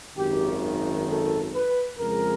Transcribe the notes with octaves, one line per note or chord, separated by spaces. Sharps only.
G#1 F#2 D#3 G4
A4
B4
F2 C#3 F3 G#3 A#4